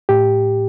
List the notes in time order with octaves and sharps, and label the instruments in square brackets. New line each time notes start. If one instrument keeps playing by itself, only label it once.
[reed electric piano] A2 G4